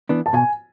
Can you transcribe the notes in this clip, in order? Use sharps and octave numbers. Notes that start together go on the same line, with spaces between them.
E3 B3 D4
A5
B2 G#5